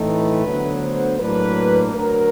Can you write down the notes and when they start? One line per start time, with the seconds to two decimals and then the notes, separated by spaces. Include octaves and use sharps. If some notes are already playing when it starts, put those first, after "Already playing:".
Already playing: A2 E3 A3 C4 D#4
0.08 B4
0.46 D2 D3 F#3 B3
0.83 C5
1.20 A2 F#3 A#3 D4 B4
1.94 D2 D3 F#3 A#4